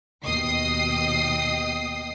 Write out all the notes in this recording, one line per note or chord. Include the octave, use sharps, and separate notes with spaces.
D#2 B2 D#5 G5 D#6 C7